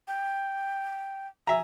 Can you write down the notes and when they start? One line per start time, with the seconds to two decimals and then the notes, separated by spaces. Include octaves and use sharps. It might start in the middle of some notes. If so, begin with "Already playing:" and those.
0.08 G5
1.47 E5 G#5 A#5